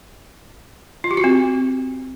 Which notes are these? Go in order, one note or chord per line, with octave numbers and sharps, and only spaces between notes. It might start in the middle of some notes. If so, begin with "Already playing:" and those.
F4
G4
F#4
C4